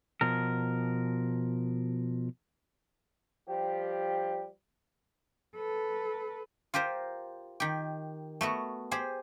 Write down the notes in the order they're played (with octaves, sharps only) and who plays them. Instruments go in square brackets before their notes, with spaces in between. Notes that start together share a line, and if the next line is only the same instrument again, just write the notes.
[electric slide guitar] B2 F3 A#4
[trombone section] F3 G3 G4
[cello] A4 B4
[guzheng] F4 G4 A#4 C5
D#3 G4
A3 B3 F#4
G4 G#4 C5